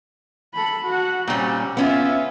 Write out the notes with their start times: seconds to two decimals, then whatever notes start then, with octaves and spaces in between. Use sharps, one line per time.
0.54 A4 B5
0.84 F#4 F#5
1.28 A#2 G3 C4 C#4
1.77 B3 C#4 F4 E5